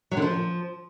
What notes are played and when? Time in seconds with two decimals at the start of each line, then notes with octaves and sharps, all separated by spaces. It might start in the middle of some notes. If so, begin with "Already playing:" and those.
0.11 F#3
0.17 D3
0.22 F3